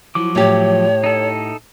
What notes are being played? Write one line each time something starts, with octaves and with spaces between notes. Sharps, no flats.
F3 F#3 E4 D6
A2 G4 C#5
D#4 A4